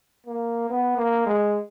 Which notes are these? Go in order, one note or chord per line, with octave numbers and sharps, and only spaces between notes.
A#3
B3
A#3
G#3